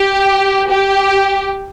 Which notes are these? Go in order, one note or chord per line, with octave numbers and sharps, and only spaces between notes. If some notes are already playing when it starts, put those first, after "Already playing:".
Already playing: G4
G4